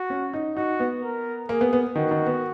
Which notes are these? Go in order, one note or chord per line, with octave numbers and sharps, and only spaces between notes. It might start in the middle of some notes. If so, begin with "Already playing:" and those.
Already playing: F#4
C#4
D#4
D#4 F#4
B3
A#4
A#3 G#4
B3
B3
D#3 F#4
D#3
B3